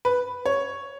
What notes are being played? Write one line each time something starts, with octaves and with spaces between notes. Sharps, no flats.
B4
C#5